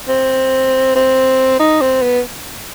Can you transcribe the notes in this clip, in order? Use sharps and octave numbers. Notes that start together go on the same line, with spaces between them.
C4
C4
D#4
C4
B3